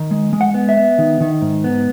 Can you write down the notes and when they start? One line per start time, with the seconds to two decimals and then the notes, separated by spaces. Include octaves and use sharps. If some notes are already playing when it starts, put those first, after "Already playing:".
Already playing: D#3
0.11 G#3
0.33 G#3
0.41 F#5
0.54 B3
0.69 E5
0.77 B3
0.98 D#3
1.21 D#3
1.42 G#2
1.64 B3